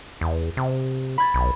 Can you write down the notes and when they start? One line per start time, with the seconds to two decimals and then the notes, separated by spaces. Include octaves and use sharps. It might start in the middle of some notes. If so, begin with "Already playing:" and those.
0.21 E2
0.57 C3
1.18 B5 G#6 A6
1.34 B1